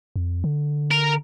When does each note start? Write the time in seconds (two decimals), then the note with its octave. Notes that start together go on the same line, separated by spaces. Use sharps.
0.16 F2
0.44 D3
0.91 A#4